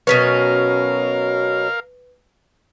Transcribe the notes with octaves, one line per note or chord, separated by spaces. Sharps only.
B2 F#3 C#4 A#4 B4 F5 B6